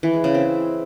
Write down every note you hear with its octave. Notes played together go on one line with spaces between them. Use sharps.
E3
G#3
C#3
C4